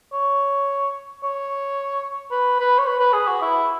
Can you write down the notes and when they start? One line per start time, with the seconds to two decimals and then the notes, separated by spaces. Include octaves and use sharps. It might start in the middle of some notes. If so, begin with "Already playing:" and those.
0.13 C#5
1.23 C#5
2.31 B4
2.60 B4
2.79 C#5
2.87 B4
3.00 B4
3.13 G#4
3.28 F#4
3.42 E4